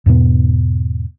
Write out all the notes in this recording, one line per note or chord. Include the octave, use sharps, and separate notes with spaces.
E2 G#2 B2 B3